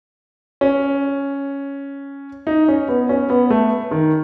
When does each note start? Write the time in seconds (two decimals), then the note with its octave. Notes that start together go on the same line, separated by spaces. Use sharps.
0.61 C#4
2.47 D#4
2.68 C#4
2.88 B3
3.09 C#4
3.30 B3
3.50 A3
3.91 D#3